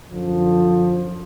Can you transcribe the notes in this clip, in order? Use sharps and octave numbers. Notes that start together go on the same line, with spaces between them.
F#2 D3 F3